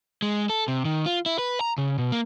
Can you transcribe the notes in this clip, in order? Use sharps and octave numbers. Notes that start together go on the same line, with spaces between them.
G#3
A4
C3
D#3
F4
E4
B4
A#5
C#3
B2
A#3